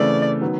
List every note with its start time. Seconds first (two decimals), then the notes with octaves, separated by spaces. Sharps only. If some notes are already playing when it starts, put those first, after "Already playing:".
Already playing: C#3 E3 A3 C4 D5
0.41 D#3 F#3 B3